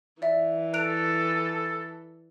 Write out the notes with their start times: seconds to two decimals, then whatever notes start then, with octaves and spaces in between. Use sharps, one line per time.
0.22 E3 D5 E5
0.74 A4 F#6 D7 F7